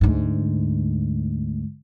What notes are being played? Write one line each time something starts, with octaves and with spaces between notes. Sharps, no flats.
D2 G#2